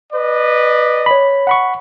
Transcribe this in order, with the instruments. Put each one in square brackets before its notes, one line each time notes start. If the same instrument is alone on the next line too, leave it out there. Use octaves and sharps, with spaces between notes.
[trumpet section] B4 D5 D#5
[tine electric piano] C#5 B5
F#5 B5 C#6